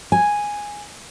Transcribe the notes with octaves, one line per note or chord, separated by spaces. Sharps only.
G#5